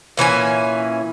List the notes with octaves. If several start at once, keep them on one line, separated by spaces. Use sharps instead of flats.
A#2 E3 C#4 G#5